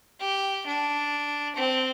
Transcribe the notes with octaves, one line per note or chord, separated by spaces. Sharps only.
G4
D4
C4